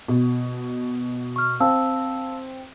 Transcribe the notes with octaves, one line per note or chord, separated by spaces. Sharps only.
B2
C#6 F6
C4 F5 A5 E6